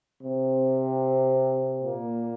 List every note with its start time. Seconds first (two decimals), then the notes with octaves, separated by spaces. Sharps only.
0.21 C3 C4
1.83 A#2 A#3